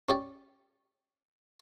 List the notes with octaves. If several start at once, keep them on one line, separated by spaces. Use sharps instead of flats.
C#4 G4 D5